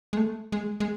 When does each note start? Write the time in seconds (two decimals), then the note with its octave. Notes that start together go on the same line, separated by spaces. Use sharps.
0.13 G#3
0.17 A3
0.52 G#3
0.80 G#3